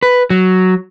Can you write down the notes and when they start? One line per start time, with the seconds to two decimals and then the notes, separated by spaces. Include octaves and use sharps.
0.03 B4
0.30 F#3